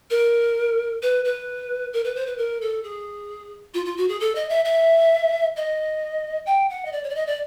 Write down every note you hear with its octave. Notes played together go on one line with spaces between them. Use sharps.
A#4
B4
B4
A#4
B4
C5
B4
A#4
A4
G#4
F4
F4
F#4
G#4
A4
D#5
E5
E5
D#5
G5
F#5
D#5
D5
C#5
D5
D#5
D5